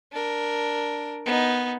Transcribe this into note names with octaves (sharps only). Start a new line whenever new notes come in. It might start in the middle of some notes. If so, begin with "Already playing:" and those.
D4 A#4
B3 D#4